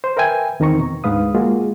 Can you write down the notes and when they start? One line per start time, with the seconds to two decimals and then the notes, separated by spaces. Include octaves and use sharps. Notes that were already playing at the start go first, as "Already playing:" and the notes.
0.04 C5
0.17 A#4 B4 E5 G5 G#5
0.60 E2 D#3 C4 A#5 C#6
0.79 B2
1.04 D2 G#2 D3 B4 F5 D#6
1.35 G#3 A#3 F4 F#4 G#4